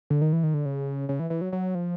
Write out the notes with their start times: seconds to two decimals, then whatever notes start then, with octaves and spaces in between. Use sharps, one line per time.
0.10 D3
0.22 D#3
0.33 E3
0.43 D#3
0.54 D3
0.65 C#3
1.09 C#3
1.19 E3
1.30 E3
1.41 F#3
1.53 F#3
1.75 F3